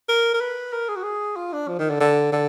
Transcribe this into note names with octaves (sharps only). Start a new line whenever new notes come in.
A#4
A#4
B4
A#4
G#4
F#4
G#4
F4
D4
F3
D#3
D3
D3
D3